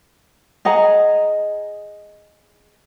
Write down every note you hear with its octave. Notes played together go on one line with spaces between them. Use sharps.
G#4 D#5 F#5 A#5